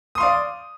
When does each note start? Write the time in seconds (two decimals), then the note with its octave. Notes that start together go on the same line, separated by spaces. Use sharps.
0.15 D#6
0.18 C6
0.20 F5
0.23 D5